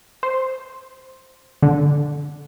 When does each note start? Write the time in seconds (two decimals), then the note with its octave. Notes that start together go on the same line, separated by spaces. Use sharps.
0.23 C5
1.63 D3